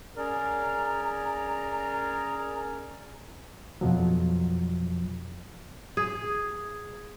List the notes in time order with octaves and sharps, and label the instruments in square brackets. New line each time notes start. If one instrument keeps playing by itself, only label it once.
[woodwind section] C#4 G#4 A#4 D5 A#5
[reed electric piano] F2 B2 F3 F#3
[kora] G#4